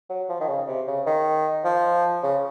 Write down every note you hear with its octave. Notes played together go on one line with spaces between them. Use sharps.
F#3
F3
D#3
C#3
C3
C#3
D#3
F3
C#3